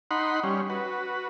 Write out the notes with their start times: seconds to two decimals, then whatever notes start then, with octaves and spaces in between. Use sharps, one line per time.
0.11 D#4 F#5 B5 C6
0.44 G3 C#4
0.70 F#4 B4